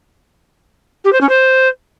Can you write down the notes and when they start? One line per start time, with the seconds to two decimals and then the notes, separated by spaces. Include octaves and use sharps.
1.04 G4
1.12 C5
1.21 C#4
1.29 C5